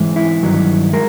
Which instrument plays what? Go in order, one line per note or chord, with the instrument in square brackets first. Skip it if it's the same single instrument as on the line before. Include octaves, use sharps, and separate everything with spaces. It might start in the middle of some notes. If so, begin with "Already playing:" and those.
Already playing: [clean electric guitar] G#2 E3 G#3
E4
G2 D#3 F#3
G#3 A#4